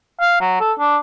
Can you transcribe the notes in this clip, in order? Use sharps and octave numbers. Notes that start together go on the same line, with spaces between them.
F5
F#3
A4
D4